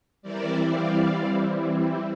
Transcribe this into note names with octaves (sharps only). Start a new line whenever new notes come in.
E3 G3 C4 E4 A#4 D5
D5 F5